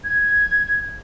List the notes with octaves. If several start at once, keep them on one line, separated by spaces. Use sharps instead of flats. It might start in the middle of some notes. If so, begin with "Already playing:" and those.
G#6